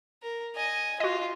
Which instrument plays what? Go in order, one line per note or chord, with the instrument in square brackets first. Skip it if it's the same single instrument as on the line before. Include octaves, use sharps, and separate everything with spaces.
[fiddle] A#4
D#5 G#5
[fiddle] F4 [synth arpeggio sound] F#4 D#5